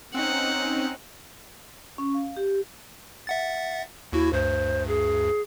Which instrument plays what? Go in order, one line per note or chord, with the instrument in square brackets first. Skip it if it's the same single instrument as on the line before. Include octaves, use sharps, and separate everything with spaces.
[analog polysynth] C4 C#4 D#4 [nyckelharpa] F#5
[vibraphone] C#4
F5
G4
[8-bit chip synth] E5 F#5 A6
[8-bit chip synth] D#2 F#4 [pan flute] E4
[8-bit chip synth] D2 G2 [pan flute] C5
[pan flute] G#4